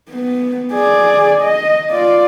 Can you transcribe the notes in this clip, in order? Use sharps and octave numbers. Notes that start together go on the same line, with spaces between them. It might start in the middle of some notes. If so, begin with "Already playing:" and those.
B3
G#4 D5
D#5
F4 D5